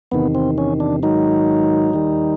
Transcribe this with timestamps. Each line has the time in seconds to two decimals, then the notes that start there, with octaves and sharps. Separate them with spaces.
0.12 E2 C3 D#3 B3
0.35 C4
0.58 C#4
0.80 D4
1.03 G#2 D#3 F#3 D#4
1.94 D#2 D#3 G3